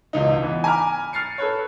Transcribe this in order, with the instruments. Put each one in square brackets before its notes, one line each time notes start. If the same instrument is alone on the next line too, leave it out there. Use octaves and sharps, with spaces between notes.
[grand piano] E1 C#2 D#4
E3 B3
G#5 A#5 B5 D6 F6
F6 A6 C7 C#7
A4 B4 C#5